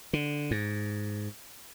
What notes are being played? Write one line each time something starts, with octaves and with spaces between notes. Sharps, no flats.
D3
G#2